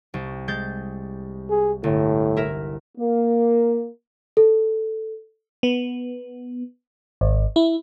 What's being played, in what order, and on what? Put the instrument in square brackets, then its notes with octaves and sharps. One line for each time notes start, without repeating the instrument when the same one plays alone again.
[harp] C2
G#3 G6 A6
[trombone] G#4
[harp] G1 [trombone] A2
[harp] E4 A#4 E5
[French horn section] A#3
[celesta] A4
[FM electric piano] B3
G#1
E4